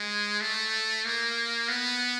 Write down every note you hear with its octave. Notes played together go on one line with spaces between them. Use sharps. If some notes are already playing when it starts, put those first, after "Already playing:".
Already playing: G#3
A3
A#3
B3